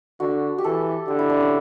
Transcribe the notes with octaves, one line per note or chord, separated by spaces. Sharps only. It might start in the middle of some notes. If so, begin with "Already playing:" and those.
D3 F#4
G4
E3 A4
D3 G4
E4
D4
C#4